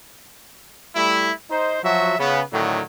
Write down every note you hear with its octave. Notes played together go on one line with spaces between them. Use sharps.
G3 A3 E4
D#4 C5
F3 F#3 F#4 E5
C#3 B3
A2 D3 D#3 F#3